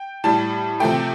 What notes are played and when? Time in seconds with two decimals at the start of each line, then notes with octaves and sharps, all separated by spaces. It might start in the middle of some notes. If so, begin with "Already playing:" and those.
Already playing: G5
0.24 A2 G3 A5
0.80 C3 F3 A3 G5